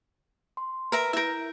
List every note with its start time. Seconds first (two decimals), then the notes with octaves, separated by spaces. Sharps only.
0.57 C6
0.92 A#4 B4 E5 A#5
1.13 E4 A#4 E5 G6